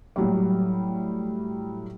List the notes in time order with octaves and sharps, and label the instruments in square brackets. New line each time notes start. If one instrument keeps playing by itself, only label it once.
[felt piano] A2 F#3 G3